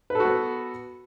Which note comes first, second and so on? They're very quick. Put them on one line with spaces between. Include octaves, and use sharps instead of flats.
B4 A4 F#4 B3